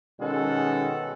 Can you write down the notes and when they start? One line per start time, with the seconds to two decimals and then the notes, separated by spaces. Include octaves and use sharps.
0.20 B2 D#3 G#3 C#4 A4 F#5